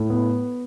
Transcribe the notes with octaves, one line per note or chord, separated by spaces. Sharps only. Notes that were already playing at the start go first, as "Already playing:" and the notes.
Already playing: A2
B3